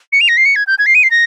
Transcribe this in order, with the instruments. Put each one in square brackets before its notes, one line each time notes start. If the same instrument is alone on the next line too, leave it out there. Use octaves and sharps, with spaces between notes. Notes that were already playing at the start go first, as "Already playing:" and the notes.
[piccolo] C#7
F7
A#6
C7
C#7
G#6
G6
G#6
C7
D#7
C7
A#6